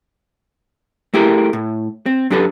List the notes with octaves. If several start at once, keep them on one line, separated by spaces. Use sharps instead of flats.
A3 E4 G4 G#4 A#4
A2
C4
F#2 D4 G4 A4 B4